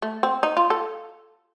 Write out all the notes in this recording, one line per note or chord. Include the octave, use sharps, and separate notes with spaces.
A3
C4
D#4
F4
A4